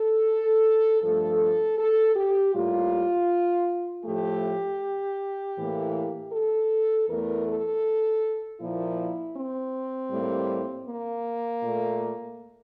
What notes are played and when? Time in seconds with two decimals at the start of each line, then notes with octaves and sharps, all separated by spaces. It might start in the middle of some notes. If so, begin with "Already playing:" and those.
Already playing: A4
1.01 G2 F3 A3 A4
1.78 A4
2.15 G4
2.53 A2 G3 A#3 F4
4.04 A2 F3 A3 G4
5.56 A2 E3 A#3
6.32 A4
7.07 E2 E3 A3 A#4
7.46 A4
8.59 A#2 F3 A#3 E4
9.35 C4
10.10 A2 G3 A#3
10.86 A#3
11.62 A#2 A3